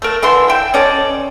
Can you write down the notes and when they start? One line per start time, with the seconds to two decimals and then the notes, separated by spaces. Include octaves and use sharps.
0.02 A3 A#4
0.22 D3 E3 E5 C6
0.50 E5 G5
0.74 C#4 A4 D5 D#5